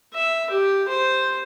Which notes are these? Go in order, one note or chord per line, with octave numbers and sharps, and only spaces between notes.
E5
G4
C5